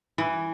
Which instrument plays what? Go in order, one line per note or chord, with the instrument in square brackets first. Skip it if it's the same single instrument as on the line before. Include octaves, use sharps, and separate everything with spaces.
[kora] E3